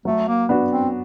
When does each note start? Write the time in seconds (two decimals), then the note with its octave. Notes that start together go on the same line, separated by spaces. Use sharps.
0.05 F#3 A3
0.28 A#3
0.49 B3 D4 F#4
0.70 C4